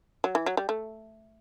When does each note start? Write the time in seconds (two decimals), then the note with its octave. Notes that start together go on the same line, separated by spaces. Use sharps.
0.24 F#3
0.35 E3
0.46 F#3
0.57 G3
0.69 A3